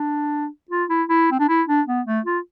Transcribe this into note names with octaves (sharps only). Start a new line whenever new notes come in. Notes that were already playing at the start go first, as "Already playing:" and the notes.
Already playing: D4
F4
E4
E4
C4
D4
E4
D4
B3
A3
F4